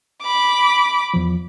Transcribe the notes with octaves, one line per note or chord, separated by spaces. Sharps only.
B5 D6
E2 F3